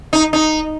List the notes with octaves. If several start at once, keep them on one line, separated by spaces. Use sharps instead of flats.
D#4
D#4